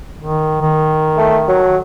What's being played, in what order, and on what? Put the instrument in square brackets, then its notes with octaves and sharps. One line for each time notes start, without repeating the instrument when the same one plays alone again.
[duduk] D#3
D#3
[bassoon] A3
F#3